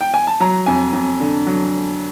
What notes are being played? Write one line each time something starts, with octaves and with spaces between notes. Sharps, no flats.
G5
G#5
A5
F#3 A#5
F2 G#5
F2
D3
F#3